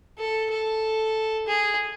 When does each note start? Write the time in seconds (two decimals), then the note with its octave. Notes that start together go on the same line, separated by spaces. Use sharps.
0.18 A4
0.51 A4
1.47 G#4